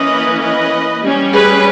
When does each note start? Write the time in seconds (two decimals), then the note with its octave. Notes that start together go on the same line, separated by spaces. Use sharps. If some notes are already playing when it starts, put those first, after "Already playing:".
Already playing: E3 A#3 C#4 B4 D#5
0.41 B4 D#5
1.03 G3 C#4
1.33 G#4 B4